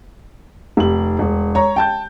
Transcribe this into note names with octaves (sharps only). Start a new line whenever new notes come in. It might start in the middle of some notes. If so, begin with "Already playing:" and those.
F1 G4 F#7
E1
C#5 A#5
G5 A5 G6